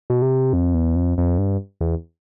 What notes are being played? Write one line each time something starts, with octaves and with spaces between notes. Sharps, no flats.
B2
C3
F2
E2
F2
F2
G2
E2